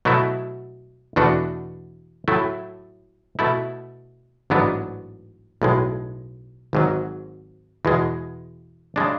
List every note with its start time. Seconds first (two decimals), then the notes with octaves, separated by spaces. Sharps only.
0.05 B2 F#3 A3 E4
1.16 E2 B2 A3 D4 F#4
2.28 A2 F#3 A3 E4
3.39 B2 A3 E4
4.50 A1 G#2 F#3 B3 D4
5.62 B1 A2 G#3
6.73 G#1 G#2 F#3
7.85 E2 B2 G#3
8.96 C#3 G#3 D4